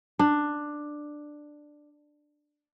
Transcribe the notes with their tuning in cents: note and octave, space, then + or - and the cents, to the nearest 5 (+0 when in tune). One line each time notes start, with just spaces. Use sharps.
D4 +10